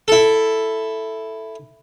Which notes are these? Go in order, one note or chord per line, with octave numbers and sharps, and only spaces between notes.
E4 A4